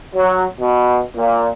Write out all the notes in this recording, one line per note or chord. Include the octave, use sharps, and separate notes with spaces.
F#3
B2
A#2